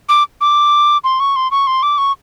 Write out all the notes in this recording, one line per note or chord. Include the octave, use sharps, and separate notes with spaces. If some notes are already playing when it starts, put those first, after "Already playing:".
D6
D6
C6
C#6
C6
C#6
C6
D6
C#6